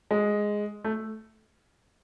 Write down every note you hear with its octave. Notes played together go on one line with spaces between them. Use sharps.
G#3
A3